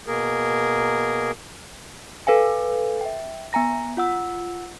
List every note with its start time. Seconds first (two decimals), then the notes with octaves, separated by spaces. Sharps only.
0.07 B2 A#3 G#4 A#4
2.27 A4 B4 F5 G#5
3.01 E5 G5
3.53 B3 G#5 A#5 A#6
3.97 F4 F#5 E6